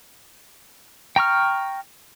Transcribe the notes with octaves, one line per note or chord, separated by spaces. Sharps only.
G5 A#5 C#6 F6